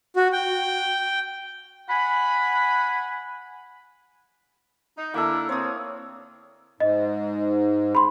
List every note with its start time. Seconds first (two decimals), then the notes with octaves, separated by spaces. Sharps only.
0.16 F#4
0.32 G5
1.89 F#5 G#5 B5
4.97 D#4
5.14 D3 A#3 E4 A4
5.49 C4 C#5 D#6
6.80 G#2 D#5
7.95 B5 C6